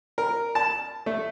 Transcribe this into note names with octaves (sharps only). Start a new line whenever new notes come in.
A#4
A5
A3